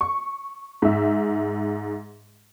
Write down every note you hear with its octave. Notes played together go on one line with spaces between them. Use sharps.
C#6
G#2 E5